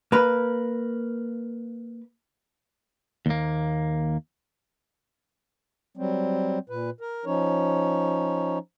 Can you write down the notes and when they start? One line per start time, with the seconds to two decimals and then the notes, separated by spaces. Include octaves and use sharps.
0.12 A#3 B4
3.26 D#2 A#3
5.97 F#3 G3 C4
6.70 A#2 B4
7.01 A#4
7.25 F3 C#4 D#4 C#5